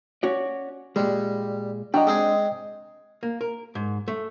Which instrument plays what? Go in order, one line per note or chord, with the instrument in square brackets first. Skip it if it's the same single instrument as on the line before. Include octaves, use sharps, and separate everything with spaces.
[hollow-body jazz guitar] C#4 F#4 D5
[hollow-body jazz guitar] A#2 G#3 [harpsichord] G3
[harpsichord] F#3 [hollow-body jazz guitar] D4 A#5 [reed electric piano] D#5 G5
[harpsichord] G#3 C4 G#4
[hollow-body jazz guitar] A#3
A#4
G#2
A3